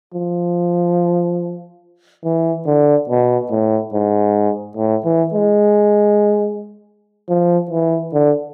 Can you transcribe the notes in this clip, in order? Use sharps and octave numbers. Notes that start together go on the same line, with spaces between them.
F3
E3
D3
B2
A2
G#2
A2
E3
G#3
F3
E3
D3